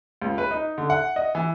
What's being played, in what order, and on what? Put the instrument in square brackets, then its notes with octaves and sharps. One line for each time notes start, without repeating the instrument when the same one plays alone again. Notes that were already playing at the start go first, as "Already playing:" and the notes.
[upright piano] C#2
B4
D#4
D3
F#5
D#5
E3